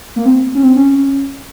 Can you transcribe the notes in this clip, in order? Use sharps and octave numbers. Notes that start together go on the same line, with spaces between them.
A#3
C4
C#4
C4
C#4